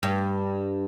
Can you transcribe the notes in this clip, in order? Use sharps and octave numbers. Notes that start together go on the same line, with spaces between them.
G2